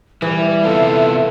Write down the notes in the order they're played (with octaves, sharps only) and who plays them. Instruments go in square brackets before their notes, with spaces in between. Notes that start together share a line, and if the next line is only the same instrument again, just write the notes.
[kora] E3 [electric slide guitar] G3 [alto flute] E5
[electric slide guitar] C3 B3 F4 [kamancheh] A4